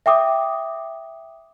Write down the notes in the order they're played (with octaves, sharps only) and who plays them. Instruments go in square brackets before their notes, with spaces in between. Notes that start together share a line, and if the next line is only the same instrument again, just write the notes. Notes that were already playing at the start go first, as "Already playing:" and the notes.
[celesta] E5 G5 D6 D#6